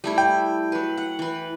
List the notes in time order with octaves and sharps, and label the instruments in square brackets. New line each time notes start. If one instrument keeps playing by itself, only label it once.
[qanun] G3 A3 E4
[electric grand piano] G5
[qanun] F#3 B4
F#5
E3 B4